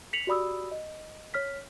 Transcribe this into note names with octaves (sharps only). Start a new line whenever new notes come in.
B6 C#7 F7 F#7
F#4 G4 D5 B5 D#6 E6
D#5
C#5 F6 B6